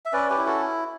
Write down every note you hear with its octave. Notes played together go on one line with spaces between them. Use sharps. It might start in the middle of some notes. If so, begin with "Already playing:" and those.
E5
C#4 B4 D5
G4 B4
E4
F#4 A4